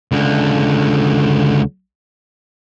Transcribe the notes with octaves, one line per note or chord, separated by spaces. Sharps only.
C#2 D3